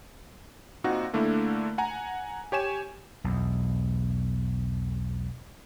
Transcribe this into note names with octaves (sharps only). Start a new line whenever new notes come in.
A#2 C4 D#4 F#4
D3 A3 A#3 D4 E4
F#5 G#5 A#5
G4 C#5 G#5 E7
B1 E2